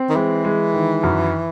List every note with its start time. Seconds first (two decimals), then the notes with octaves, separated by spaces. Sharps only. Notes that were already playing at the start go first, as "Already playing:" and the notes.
Already playing: C4
0.10 D#3
0.15 E3 G#3
0.45 G#3
0.74 D#3
1.03 F#2